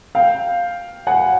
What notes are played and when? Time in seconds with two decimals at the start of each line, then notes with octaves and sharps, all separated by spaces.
0.15 F5 G5
1.07 F#5 G#5